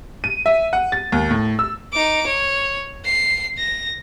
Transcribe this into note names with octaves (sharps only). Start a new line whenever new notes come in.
D#7
E5
F#5
A6
D#2
A2
E6
D#4 D6
C#5
C7
A#6